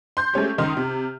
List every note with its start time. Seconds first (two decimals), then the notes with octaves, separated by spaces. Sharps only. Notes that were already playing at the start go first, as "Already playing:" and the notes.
0.17 C6 G6
0.34 G#3 A3 C#4 G4
0.58 C#2 D#3 D#4 C6 D#6 F6
0.77 C3